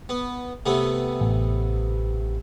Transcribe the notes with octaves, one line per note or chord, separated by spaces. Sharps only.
B3
C3 A3 B3
A1